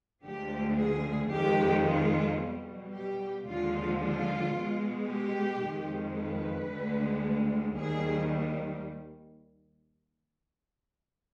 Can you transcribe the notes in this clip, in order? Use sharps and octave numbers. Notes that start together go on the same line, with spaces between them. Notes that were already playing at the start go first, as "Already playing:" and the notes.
D2 D3 F3 G#3 G4
G#4
F2 D#3 G#3 G4
F4
B2 G3
G4
D#2 D3 F3 G#3 F4
F4
B2 G#3
G4
F2 D#3 G#3
B4
D2 D3 G#3
D#2 D#3 G3 G#4